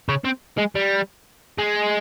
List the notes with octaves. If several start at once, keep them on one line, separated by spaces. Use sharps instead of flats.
C#3
C4
G#3
G3
G#3